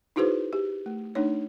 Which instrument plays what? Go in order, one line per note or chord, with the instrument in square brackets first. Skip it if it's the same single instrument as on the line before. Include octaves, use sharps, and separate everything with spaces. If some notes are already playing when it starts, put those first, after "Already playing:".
[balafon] D#4 E4 F#4 G#4 B4 C5
G4
A3
A3 D4 D#4 C#5